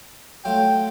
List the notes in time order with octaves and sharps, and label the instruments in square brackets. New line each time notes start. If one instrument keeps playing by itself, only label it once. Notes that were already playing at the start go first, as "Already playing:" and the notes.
[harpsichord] F#3 A3 F4 [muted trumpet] G5